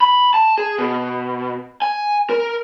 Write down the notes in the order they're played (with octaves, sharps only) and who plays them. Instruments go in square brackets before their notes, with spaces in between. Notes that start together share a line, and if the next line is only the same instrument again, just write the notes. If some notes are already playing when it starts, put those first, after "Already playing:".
[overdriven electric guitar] B5
A5
G#4
B2
G#5
A#4